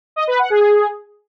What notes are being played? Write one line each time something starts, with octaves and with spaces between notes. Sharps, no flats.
D#5
B4
F#5
G#4